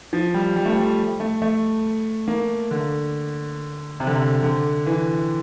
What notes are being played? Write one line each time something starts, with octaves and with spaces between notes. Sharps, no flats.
F3
G3
G3
A3
G3
A3
A3
A#3
D3
C3
D3
C3
D3
E3